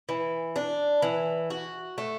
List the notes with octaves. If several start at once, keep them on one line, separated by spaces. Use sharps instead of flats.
E3
D4
E3
F#4
A3